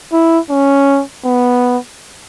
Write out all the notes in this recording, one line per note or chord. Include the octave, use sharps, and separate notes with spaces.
E4
C#4
B3